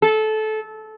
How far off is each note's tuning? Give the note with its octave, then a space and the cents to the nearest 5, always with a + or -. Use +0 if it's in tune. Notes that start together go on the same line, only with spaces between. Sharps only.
A4 -20